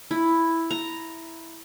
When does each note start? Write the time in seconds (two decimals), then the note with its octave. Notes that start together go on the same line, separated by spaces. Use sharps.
0.11 E4
0.71 A#5